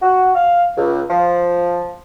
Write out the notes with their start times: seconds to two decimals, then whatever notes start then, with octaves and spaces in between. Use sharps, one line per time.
0.02 F#4
0.35 F5
0.77 C#2
1.10 F3